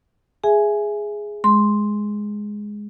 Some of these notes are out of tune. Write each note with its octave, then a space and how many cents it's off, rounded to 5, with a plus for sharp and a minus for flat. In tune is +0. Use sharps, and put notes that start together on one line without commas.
G#4 +0 E5 +10 G#5 +10
G#3 +0 C6 +0